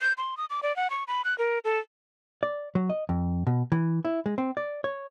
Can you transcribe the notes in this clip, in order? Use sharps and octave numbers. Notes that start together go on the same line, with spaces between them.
G6
C6
D#6
D6
D5
F#5
C#6
B5
F#6
A#4
A4
D5
F#3
D#5
F2
B2
E3
E4
G#3
C4
D5
C#5